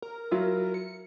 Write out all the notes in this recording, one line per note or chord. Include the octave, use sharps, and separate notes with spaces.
A#4
F#3 E4 F4
C#7